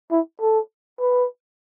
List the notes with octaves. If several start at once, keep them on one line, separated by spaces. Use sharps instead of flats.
E4
A4
B4